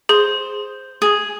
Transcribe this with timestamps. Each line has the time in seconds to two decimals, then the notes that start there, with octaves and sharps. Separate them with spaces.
0.09 G#4 C5
1.02 G#4